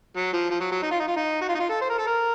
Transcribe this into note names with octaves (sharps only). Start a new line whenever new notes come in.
F#3
F3
F3
F#3
F#3
D#4
F4
D#4
F4
D#4
F#4
F4
D#4
F4
A4
C5
A#4
A4
A#4